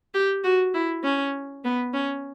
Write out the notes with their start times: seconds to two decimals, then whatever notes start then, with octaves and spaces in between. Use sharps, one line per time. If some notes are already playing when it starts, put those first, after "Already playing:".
0.14 G4
0.44 F#4
0.74 E4
1.04 C#4
1.65 B3
1.94 C#4